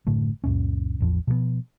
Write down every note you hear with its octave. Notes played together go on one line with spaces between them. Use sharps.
F#1 A2 D3 A3
C#2 F#2 A#2 C#4
A1 E2 F3
B2 F3 G#3 B3